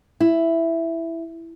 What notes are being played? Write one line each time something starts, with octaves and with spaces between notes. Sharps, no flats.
E4